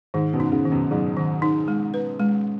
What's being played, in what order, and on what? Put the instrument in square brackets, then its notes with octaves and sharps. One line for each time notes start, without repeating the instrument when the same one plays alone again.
[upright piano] G#2 [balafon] D#3
[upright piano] F#2 B2
[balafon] D#4
[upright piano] G#2 C#3
[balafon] D#3
[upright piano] F#2 B2
[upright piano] G#2 C#3 [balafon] F#3
[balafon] D#3
D#4
G#3
B4
G#3